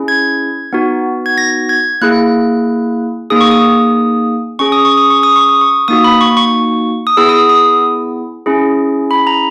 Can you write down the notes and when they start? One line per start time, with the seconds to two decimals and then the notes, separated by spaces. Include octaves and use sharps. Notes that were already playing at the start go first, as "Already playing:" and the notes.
Already playing: C#4 E4 G#4
0.08 G#6
0.73 B3 D#4 F#4
1.26 G#6
1.38 A#6
1.69 G#6
2.02 A#3 E4 G#4 F#6
3.30 A#3 D#4 G#4 D#6
3.41 C#6
3.51 D#6
4.59 C#4 G#4 C#6
4.72 D#6
4.85 C#6
4.97 D#6
5.10 C#6
5.23 D#6
5.36 C#6
5.49 D#6
5.61 C#6
5.88 A#3 D#4 F#4 D#6
6.04 B5
6.21 C#6
6.37 C#6
7.07 D#6
7.17 B3 E4 G#4 E6
7.29 D#6
7.33 E6
7.49 D#6
8.46 C#4 E4 G#4
9.11 B5
9.27 A#5